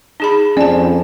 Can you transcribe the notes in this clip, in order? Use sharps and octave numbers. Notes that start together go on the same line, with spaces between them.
D#4 G#4 B5
F2 C#4 D5 A5